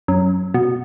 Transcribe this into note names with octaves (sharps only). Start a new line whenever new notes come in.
F#2
B2